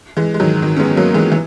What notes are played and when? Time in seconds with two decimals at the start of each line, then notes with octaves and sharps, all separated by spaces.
0.17 E3 G#3
0.34 G#3
0.40 D#3 F#3
0.62 D#3
0.76 C#4
0.79 G#3 B3
0.97 F#3 A#3
1.14 E3 G#3
1.32 E3